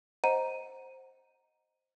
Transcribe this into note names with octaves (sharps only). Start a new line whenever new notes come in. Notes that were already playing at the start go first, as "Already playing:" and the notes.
C5 D#5 F#5 A#5 D#7